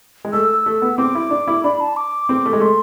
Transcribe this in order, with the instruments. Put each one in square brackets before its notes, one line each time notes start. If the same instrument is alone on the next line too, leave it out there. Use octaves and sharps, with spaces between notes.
[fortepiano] G#3
[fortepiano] A3 [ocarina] E6
[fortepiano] A3
B3
[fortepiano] C4 [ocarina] D6
[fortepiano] E4
D4
E4
[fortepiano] D4 [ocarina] B5
[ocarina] A5
D6
[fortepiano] C4
A3
G#3
[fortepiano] A3 [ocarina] C6